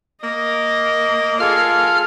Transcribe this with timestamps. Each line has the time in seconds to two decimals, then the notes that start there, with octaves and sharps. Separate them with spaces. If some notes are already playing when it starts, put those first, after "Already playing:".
0.24 A#3 D#5
1.40 F4 G#4 A4 F5 F6